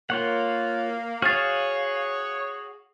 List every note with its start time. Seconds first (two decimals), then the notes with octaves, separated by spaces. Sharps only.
0.10 A#3 F4 C#5 F#5
1.22 F#4 G#4 C#5 F5 F6 A6